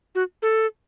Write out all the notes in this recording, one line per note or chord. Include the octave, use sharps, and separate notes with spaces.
F#4
A4